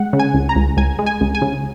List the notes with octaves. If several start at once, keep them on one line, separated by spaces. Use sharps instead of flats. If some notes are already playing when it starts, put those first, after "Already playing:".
Already playing: G#3 F#5
C#3
G#5
C#2
A#5
C#2
C#2 G#5
G#3
G#5
C#2
G#5
C#3